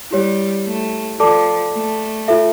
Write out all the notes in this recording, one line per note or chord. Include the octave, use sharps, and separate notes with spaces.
G3 E4 G4 C#5
A3
F3 A4 D5 A5 D6
A3
F4 A4 E5